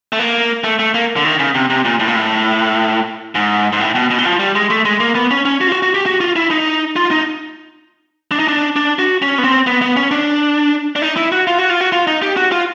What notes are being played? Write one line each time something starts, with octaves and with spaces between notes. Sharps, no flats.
A3
A#3
A3
A3
A#3
D3
D#3
C#3
C3
C3
A#2
A2
A#2
A2
G#2
G#2
A2
B2
B2
E3
F3
G3
G#3
A3
G#3
A#3
B3
C#4
C#4
F#4
F4
F#4
F#4
G4
F#4
F4
E4
D#4
F4
D#4
D4
D#4
D4
D4
F#4
C#4
B3
C4
B3
B3
C#4
D4
D4
D#4
E4
F#4
F4
F#4
F4
F#4
F4
D#4
G4
F#4
F4